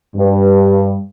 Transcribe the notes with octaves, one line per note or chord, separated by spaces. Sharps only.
G2